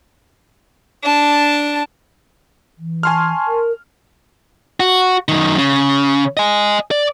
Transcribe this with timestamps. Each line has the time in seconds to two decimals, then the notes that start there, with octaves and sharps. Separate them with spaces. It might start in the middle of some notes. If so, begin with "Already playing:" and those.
1.03 D4 A5
2.78 E3
3.03 G#5 A5 C6 C#6 F6
3.47 A#4
4.80 F#4
5.28 F#2 D#3
5.58 C#3
6.37 D#5 G#5
6.91 D5